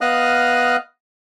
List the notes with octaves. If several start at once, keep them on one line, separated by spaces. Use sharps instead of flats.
B3 D#5 F5 D#6 F6 F#6